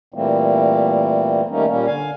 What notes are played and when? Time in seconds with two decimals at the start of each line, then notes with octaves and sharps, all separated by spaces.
0.14 A#2 E3 G3 A3 A#3 C4
1.49 D#3 G3 A3 A#3 C#4 D#4
1.68 A#2 G3 A#3 C#4
1.86 D3 F5 G#5